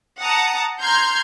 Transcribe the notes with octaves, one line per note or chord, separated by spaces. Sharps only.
F#5 A5 A#5 D#6
A#5 C6 F6 G6 G#6